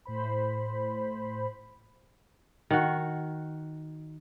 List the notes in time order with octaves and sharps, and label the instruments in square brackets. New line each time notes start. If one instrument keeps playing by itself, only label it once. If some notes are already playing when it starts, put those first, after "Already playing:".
[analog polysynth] A2 C5 B5
[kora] D#3 F#4